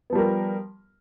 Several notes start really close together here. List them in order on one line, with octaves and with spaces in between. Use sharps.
B3 F3 G3 A#4